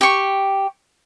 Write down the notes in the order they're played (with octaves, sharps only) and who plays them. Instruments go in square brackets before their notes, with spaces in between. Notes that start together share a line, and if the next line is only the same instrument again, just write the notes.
[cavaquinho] G4 C#6